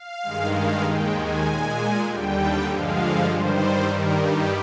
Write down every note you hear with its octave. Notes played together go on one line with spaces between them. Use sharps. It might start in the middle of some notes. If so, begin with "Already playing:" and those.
Already playing: F5
G2 D#3 G#3
F5
D#2 D#3 G#3 G5
G#5
A#2 G#3
D#2 D3 G3 G5
G2 D3 F3 G#3 F5
G2 D#3 G3 C5
G2 D#3 G3 A#4
G4